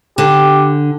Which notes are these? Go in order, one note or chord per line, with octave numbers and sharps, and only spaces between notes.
D3 G4